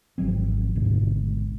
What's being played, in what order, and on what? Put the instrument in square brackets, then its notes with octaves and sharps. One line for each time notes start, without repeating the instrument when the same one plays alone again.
[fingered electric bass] G#1 F3 F#3 C4
G#1 D2 G#2 B2